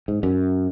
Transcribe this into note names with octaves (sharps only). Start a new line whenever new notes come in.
G#2
F#2